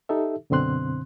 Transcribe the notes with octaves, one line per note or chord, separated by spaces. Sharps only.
D#4 G4 A4 E5
F#2 B2 D3 C4 C6 F#6